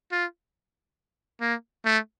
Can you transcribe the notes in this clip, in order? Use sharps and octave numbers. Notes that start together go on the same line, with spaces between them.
F4
A#3
A3